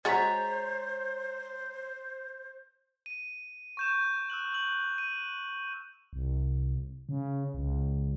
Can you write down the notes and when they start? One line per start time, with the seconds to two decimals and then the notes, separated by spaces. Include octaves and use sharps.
0.05 G#3 F#4 G#4 C5 C#5 A#5 A6 B6
3.06 D#7
3.77 C#6 G6 E7
4.30 E6 F#6 F#7
4.54 F#7
4.98 D#7
6.13 C2
7.09 C#3
7.54 C#2